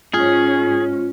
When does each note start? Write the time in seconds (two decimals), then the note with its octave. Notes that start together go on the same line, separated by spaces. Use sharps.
0.14 G#2 C#4 F4 G#4